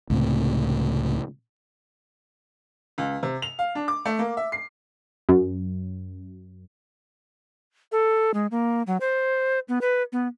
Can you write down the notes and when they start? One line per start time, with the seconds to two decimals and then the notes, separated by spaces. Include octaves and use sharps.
0.10 C#2 A2 C3
2.98 C#2
3.23 C3
3.42 F7
3.59 F5
3.75 D4
3.88 D6
4.05 A3
4.19 A#3
4.37 E5
4.52 C7
5.29 F#2
7.92 A4
8.34 G#3
8.51 A#3
8.87 F#3
9.01 C5
9.69 B3
9.81 B4
10.12 B3